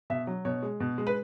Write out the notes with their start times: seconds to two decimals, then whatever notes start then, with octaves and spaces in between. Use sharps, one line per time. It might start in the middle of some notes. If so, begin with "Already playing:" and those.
0.10 B2 E5
0.27 F#3
0.45 B2 C#5
0.63 G#3
0.80 B2
0.98 G#3
1.07 B4